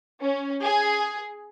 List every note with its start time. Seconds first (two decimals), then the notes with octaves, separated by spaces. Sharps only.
0.22 C#4
0.63 G#4